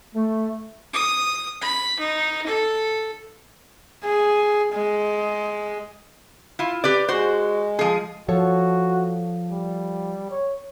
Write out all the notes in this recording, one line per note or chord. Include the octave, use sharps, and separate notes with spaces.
A3
D#6
B5
D#4
A4
G#4
G#3
E4 F4
G4 B4 D5
G#3 F#4 C5
F3 G#4
F3 F#4 A4 C#5
G3
C#5